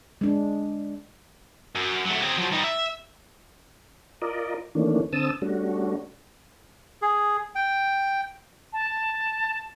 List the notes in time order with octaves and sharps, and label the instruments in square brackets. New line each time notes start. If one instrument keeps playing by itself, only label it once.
[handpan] G#3 D4
[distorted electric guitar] F#2
F#3 A3
C4 G#4
F3 F#3
G3 D#4
E5
[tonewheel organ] F4 A#4 D5 D#5
D#3 E3 A3 A#3 C#4 D4
D3 C4 A5 D#6 E6
G3 A3 C#4 D4 F#4
[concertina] G#4
G5
[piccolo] A5